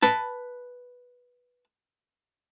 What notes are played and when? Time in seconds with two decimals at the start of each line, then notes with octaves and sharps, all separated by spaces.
0.02 B4 A5